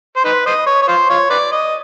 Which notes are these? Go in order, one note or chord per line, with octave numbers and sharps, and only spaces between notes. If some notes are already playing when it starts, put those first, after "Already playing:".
C5
D#4 B4
C5 D#5
C#5
C#5
F4 C5
F4 C#5
B4 D5
D#5